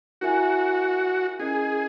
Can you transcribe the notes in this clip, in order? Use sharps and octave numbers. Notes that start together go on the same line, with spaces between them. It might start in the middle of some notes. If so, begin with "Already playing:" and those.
E4 F#4 A#4 E5 G#5
C#4 E4 G#4 A#4 D#5 G#5